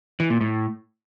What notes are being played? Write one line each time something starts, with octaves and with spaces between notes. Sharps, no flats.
E3
A#2
A2